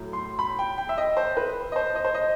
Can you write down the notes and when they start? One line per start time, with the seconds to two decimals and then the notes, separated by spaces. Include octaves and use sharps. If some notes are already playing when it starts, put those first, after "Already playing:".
Already playing: A2 F#3
0.13 C6
0.39 B5
0.59 G5
0.78 G5
0.89 E5
0.98 D#5
1.17 C5
1.37 B4
1.72 D#5
1.76 C5
1.95 D#5
2.05 C5
2.15 D#5